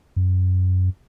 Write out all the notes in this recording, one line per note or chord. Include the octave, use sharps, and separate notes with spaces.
F#2